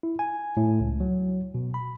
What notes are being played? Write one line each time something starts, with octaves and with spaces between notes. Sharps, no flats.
E4
G#5
A2
C#2
F#3
B2
B5